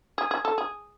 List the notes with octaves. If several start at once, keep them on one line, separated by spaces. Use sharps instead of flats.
G#4
G#4
A4
G#4